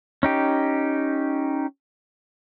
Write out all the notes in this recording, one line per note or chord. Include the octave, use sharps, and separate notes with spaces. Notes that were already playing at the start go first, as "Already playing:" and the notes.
C#4 D#4 G4